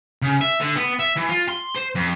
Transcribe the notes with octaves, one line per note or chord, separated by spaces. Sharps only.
C#3
E5
D3
B3
E5
E3
F4
C6
C5
F2